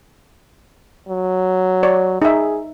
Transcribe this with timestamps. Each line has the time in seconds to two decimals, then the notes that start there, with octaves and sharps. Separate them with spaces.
1.09 F#3
1.83 C#5 D5
2.22 D#4 G#4 E5